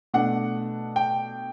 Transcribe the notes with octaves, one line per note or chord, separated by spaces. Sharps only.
B2 A3 D4 F#5
G5